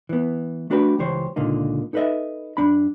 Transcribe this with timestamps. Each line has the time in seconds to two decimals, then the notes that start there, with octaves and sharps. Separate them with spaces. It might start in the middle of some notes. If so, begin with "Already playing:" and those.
0.09 E3 B3
0.70 A3 D4 F#4 G4 B4
0.99 C#2 E3 G4 C5 C#5
1.36 C#2 A#2 D3 A#3 D#4
1.93 D#4 A4 B4 C5 D#5 E5
2.57 F#2 A#2 D4 B5